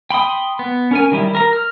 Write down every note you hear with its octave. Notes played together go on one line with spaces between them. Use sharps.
G5 B5 C6 D#6
B3
C#4 A#4 G#5
D#3 G3 E4
A#4 A#5
F6